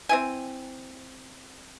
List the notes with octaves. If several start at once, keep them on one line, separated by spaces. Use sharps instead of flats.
C4 E4 G#5